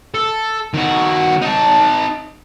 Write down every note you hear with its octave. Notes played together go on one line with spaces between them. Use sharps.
A4
D#3 F#4
D#4 A5